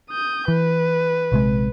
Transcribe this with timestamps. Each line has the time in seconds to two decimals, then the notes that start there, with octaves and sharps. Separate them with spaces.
0.11 D#6 G6
0.48 E3 B4
1.32 A#1 C3 G#3